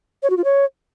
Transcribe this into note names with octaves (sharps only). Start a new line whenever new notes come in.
C#5
F#4
F4
C#5